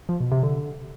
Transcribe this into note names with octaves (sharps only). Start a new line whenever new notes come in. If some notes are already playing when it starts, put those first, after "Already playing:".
F3
B2
C3
D3